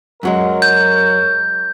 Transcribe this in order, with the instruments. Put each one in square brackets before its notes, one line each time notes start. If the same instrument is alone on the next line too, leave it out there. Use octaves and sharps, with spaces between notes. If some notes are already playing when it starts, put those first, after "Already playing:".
[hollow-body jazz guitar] F#2 F#3 G#3 [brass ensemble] A#4 C#5
[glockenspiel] G6